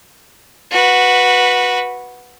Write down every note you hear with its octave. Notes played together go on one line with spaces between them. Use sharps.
F#4 B4